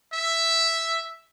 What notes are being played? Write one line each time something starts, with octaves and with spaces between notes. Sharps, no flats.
E5